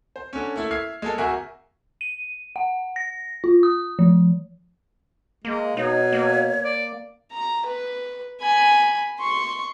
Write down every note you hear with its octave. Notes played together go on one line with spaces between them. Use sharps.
C5
D3 C#4
A3 A#3 E4
E5 F6 G#6 C7
G#3 A#3 A4
D1 F#4 A#4 E5 G#5 C#6
D#7
F#5
A#6
F4
D#6
F3
G#3 A#3
B2 D#4 C#5
A#3
D5
A#5
B4
G#5 B5
C6 C#6